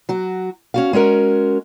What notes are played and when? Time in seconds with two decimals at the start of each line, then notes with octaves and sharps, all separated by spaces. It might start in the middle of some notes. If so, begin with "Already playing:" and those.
0.09 F#3 F#4
0.74 C#4 F#4 F5
0.93 G#3 C#4 F#4 A#4